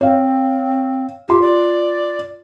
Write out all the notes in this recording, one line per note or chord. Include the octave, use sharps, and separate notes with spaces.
C4 C#5 F5
F4 G4 C6
D5